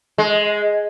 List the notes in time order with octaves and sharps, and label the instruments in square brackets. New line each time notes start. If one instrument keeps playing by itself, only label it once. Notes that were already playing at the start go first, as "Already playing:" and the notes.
[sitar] G#3